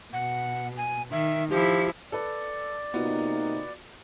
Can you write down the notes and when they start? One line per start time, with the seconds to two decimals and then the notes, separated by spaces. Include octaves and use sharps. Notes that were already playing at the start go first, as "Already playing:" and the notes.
0.13 B2 F#5
0.77 G#5
1.12 D#3 E5
1.50 F3 E4 G4
2.12 A4 B4 D5
2.94 C3 A#3 B3 D#4 F4 F#4